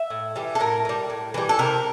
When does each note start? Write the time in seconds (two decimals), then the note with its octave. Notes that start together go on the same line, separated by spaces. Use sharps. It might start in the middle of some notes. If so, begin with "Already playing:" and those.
Already playing: E5
0.10 A2
0.36 E3 G3
0.55 A4
0.60 A2 A#4
0.85 E3
0.89 G3
1.10 A2
1.34 E3 G3
1.49 A4
1.59 C3 A#4